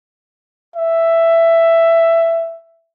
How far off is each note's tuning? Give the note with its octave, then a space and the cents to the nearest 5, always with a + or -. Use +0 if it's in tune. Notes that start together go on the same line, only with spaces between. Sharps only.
E5 +10